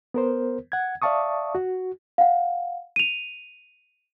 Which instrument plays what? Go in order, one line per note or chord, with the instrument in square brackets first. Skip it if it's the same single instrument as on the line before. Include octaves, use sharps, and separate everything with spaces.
[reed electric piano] B3 A#4 C5
F#5 G#6
D5 E5 F5 A5 C#6 D#6
F#4
[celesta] F5 F#5
D#7 F7